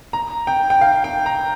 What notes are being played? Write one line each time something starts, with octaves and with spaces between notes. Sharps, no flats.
A#5
G5
G5
F5
G5
A#5